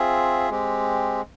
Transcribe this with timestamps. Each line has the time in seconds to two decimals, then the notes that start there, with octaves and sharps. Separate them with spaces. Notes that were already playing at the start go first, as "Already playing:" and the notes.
Already playing: C4 F4 G#4 E5
0.50 G#3 C4 G4